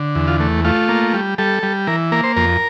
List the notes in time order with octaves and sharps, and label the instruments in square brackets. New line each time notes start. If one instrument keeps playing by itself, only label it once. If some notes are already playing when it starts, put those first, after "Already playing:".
Already playing: [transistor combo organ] D3
E2
F4
A3
A3 F4
A#3
G3
G3 A4
G3
E3 A#4
A#3 A#4
C5
F2 A#4